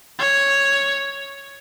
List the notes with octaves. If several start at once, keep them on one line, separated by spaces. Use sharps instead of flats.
C#5